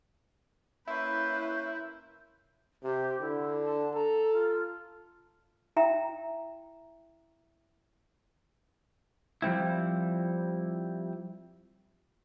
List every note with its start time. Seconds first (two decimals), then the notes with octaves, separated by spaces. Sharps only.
0.87 A#3 C#4 E4 B4 C6 G6
2.84 C3 G4
3.21 D3 E4
3.63 A5
3.94 A4 A#5
4.32 F4
5.77 E4 E5 G5 A#5
9.42 F3 G3 C4 E4